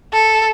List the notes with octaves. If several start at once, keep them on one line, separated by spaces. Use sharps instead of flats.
A4